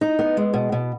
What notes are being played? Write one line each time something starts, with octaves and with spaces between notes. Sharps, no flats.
D#4
B3
G#3
B2
B2